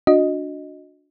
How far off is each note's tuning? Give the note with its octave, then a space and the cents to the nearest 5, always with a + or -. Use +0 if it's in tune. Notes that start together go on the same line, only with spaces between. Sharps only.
D4 -10 F#4 -35 D#5 +0